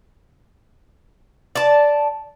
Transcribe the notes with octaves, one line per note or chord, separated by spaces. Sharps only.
D5 A5